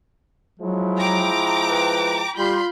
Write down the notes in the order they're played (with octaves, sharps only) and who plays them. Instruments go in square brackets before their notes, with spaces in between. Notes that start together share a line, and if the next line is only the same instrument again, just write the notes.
[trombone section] F3 G#3 E4 [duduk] F#3
[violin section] G5 A#5 D6
[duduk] B4
[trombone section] G3 [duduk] F4 [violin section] B5 C6 G6